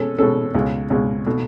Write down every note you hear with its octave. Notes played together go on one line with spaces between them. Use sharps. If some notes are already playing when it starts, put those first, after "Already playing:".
Already playing: B2 G#3 C#4 A4
B2 G#3 C#4 A4
C#2 B2 G#3
C#2 B2 G#3
B2 A3